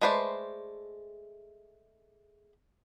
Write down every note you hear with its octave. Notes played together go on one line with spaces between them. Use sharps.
G#3 A3 B4 C5 D5